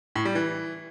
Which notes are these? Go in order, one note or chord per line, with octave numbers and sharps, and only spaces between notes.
A2
G3
E3